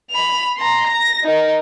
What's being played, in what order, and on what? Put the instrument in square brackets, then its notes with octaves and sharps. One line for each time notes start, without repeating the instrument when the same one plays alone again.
[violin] B5 F7
A#5 C6
A#6
D#4 A#4